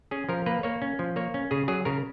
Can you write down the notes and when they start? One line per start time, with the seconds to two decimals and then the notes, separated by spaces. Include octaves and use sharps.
0.11 C#4 G#4
0.29 F3 A#4
0.46 A#3 B4
0.63 A#3 C#5
0.82 C#4
0.99 F3
1.16 A#3 C#5
1.34 C#4
1.51 C#3 G#4
1.68 F#3 G#4
1.85 C#3 A#4